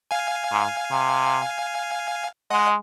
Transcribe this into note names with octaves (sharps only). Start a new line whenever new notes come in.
F5 G#5
G#2
C3
G#3 D#5 F#5